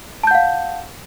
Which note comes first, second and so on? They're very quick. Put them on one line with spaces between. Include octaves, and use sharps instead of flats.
A5 G6 F#5 F5